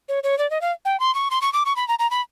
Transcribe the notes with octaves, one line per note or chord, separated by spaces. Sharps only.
C#5
C#5
D5
D#5
F5
G5
C6
C#6
C6
C#6
D6
C#6
B5
A#5
A#5
B5